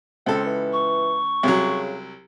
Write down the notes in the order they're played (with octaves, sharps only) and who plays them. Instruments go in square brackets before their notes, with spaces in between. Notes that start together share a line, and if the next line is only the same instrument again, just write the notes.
[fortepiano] C#2 A4 [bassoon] C4
[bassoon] E3
[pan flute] C#6
[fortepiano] C2 F#3 [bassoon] C#3